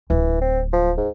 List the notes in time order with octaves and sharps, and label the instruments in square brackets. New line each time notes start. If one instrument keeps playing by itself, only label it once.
[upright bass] D1 [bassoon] E3
[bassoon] C4
F3
G#2